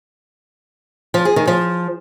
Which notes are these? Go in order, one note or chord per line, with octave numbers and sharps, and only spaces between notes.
F3
G#4
D#3
F3